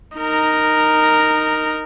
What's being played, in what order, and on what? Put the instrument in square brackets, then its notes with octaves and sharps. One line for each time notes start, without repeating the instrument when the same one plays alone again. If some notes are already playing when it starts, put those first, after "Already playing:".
[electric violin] D#4 A#4